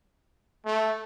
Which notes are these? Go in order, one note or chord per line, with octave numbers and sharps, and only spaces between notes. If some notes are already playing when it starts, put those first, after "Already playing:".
A3